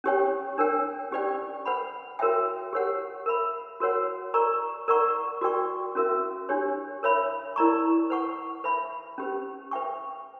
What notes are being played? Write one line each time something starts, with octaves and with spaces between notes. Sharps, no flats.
C#4 G4 C#5 G5
D4 A#4 C#5 G5
C#4 G4 B4 D5 G5
B4 F#5 B5
F#4 A#4 C#5 E5 G5
G4 A#4 C#5 F#5
A#4 E5 B5
F#4 A#4 C#5 F#5
A#4 D5 A#5 C#6
A#4 D5 F#5 A#5 C#6
F#4 A#4 D5 G5 C#6
C#4 F#4 A#4 E5
D4 G4 C#5
A#4 C#5 E5 B5
E4 A#4 D5 A#5 C#6
B4 F#5 C#6
B4 E5 B5
C#4 G4 B4
B4 E5 G5 C#6